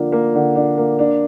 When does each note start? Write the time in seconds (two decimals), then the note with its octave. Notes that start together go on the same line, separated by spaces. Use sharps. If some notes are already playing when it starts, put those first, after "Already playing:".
Already playing: D3 F3 A#3 D4
0.12 A#3
0.35 D3
0.56 D4
0.78 A#3
0.99 D4